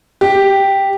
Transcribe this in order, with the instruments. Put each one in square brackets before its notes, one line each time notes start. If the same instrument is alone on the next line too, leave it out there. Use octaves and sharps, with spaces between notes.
[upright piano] G4